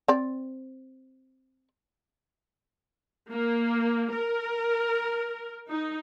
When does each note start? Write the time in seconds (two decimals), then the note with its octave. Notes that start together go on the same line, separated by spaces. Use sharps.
0.08 C4 D5
3.31 A#3
4.12 A#4
5.68 D#4